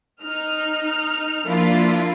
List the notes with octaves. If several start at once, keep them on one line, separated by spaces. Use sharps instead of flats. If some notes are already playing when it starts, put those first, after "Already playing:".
D#4 F6
F3 A#3 D4 E4 F4